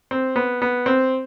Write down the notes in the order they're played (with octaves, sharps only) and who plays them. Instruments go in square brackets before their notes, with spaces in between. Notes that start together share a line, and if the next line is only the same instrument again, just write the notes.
[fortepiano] C4
B3
B3
C4